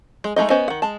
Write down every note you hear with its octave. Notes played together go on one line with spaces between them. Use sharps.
G#3
G#3 A3 D#4 D#5
B3 C#4 C5 D#5
D#3 F#5
G#3 A5